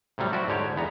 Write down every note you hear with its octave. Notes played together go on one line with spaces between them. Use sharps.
A2 C3 F#3 G3
F3 F#4 D5 E5
G#2 D3 G4 C#5
E2 B3 A#5